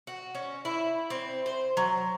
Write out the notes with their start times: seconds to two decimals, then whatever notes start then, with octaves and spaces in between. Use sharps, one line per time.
0.07 F#4
0.35 C#4
0.65 E4
1.10 C4
1.46 C5
1.77 F#3